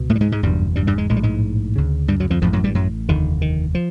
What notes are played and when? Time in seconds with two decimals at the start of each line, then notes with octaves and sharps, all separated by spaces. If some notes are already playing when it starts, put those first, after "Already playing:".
Already playing: C#2 B2
0.10 A2 A3
0.16 G3
0.21 G#2 G#3
0.32 G#2 G#3
0.43 F#1 E2 G2 B2 G3
0.76 G2 G3
0.87 G2 G3
0.98 G#2 G#3
1.09 A#1 A2 G#3
1.17 G3
1.23 G#2 G#3
1.76 D2 C#3
2.08 G2 G3
2.20 F#2 F#3
2.30 F2 F3
2.42 A1 F2 A2 F3
2.53 F#2 F#3
2.64 G2 G3
2.75 F#2 F#3
3.08 F1 D#2 D3 D#3
3.42 D#3
3.75 F3